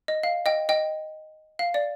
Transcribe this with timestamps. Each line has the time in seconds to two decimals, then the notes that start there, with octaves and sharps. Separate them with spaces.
0.08 D#5
0.23 F5
0.46 D#5 G5
0.69 D#5 G5
1.59 F5
1.74 D5